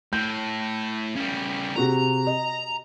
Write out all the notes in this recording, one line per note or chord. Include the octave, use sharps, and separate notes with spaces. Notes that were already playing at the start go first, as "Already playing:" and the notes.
A2 G6
C#3 G3
C3 F#4 G#4 A#5
D#5